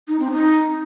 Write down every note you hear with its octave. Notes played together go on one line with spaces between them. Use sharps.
D#4
C4
D#4